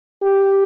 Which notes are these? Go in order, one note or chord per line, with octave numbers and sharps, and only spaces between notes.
G4